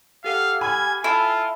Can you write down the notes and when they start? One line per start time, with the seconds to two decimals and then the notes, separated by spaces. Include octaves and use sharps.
0.24 G4 A4 F5 F#5
0.61 G#5 B5 F6 G#6
1.04 E4 F4 A4 A5